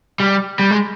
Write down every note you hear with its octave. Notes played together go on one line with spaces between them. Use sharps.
G3
G3
G#3